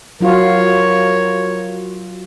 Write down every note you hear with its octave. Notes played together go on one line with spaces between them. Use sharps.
F#3 F4 F#4 A#4 C#5